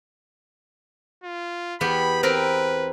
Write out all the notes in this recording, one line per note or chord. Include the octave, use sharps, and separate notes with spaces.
F4
E2 B3 G4 B5
C4 A#4 B4 B5